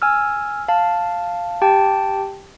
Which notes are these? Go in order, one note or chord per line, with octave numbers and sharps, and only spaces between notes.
G#5 E6 F6
F5 A5
G4 G5 A5